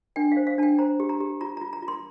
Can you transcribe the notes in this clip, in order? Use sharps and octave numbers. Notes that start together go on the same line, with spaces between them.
D4 G5
C5 F5
F5
D4 G5 A5
C5 A#5
G4
A#5
G4
F4 A#5
F4 A#5
A#5
F4
C6